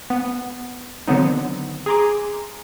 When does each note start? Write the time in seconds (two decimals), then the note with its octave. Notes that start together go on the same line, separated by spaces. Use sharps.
0.10 B3
1.07 D3 D#3 F#3 B3 C4 D#4
1.86 G#4 G#5 A#5 C6 D6